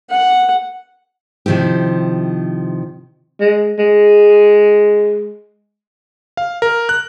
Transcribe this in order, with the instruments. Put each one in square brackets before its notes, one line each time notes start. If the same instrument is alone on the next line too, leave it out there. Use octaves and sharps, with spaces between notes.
[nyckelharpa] F#5
[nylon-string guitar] C3 D#3 F3 E4 G4
[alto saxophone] G#3
G#3
[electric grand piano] F5
A#4
F#6